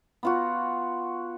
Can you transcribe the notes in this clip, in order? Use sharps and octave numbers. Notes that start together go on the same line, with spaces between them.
B3 F4 F#4